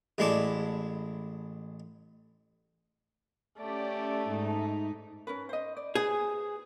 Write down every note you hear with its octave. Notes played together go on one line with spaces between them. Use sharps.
A1 G#3 E4 D5 A5
A3 C#4 G4 D5
G#2 D#4
C#4 A#4 B4
C5 D#5
D5
G#4 B4 C5 G#5